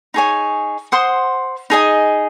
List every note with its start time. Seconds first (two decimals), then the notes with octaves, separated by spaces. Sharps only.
0.14 D#4 G#4 C#5 G#5
0.92 C5 F#5 C6 D#6
1.70 D#4 G#4 D#5 G#5